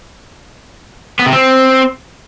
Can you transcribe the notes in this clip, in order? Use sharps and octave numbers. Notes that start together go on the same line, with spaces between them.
B3
C3
C4